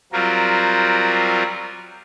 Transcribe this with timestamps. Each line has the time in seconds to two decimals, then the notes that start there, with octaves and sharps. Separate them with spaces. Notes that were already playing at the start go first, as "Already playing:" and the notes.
0.12 F#3 G3 C4 F4 A#4